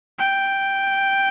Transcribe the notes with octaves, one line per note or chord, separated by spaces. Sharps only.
G5